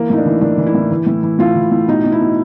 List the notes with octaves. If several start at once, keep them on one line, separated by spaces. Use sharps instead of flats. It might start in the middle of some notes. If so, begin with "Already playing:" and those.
Already playing: E3 A#3
A2 D#4
D4
E3
A2 D4
E3
E4
A2
E3
A2
E3
A2 F4
E3
A2
B2 D#4
B2
E4
B2